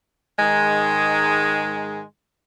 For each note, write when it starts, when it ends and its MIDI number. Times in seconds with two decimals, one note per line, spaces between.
0.39 2.01 44
0.39 2.01 51
0.39 2.01 56